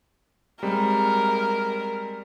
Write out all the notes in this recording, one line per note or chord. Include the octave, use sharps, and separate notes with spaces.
G3 G#3 C4 A#4